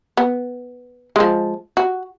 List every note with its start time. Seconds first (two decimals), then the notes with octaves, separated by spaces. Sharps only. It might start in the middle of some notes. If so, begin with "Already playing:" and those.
0.17 B3
1.16 F3 G#3
1.77 F#4